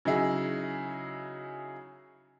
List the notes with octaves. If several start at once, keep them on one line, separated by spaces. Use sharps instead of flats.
C#3 F#3 D#4 E4 G#4